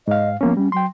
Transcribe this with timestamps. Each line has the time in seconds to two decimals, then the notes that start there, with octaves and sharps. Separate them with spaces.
0.08 G#2 D#5 F5
0.41 F3 A#3 B3 C#4
0.57 G3 C#4
0.72 F#3 G5 C6